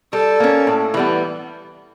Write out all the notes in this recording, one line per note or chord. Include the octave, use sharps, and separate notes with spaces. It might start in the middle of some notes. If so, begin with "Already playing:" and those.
G3 A4
A#3 C#4
A2
E3 G3 B3